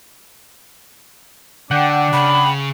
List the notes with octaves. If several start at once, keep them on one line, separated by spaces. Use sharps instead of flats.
D3 D4 F#5 G5
C#3 B5